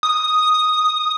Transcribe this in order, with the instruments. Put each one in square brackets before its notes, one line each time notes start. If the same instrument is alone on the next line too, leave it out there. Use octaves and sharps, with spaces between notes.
[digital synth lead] D#6